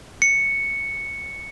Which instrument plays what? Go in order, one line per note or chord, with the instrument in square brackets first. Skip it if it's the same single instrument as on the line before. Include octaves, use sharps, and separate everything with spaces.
[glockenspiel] C#7